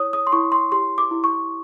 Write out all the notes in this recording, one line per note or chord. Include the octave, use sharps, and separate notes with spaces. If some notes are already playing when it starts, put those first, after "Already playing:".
Already playing: E4 C#5 D#6
D#6
C6
E4 C#6
C6
G4 C6
D6
E4
C#6